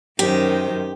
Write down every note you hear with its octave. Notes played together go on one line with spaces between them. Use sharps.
F#2 D#3 G4 C5